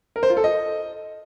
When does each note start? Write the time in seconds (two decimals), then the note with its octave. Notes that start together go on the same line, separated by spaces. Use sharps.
0.16 A#4
0.23 C5
0.30 F4
0.37 A4
0.44 D#5